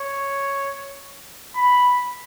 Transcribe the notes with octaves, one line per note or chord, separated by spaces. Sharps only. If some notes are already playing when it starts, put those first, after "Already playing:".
Already playing: C#5
B5